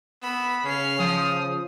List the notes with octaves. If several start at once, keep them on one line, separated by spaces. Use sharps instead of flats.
B3 B5 E6
C#3 C#4 C7 F7
F3 D#6